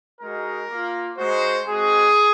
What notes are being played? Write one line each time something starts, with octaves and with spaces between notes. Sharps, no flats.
G#3 D#4 F#4 A#4
A#3 F4
G#3 D#4 F#4 C5
G#3 C4 F#4 G#4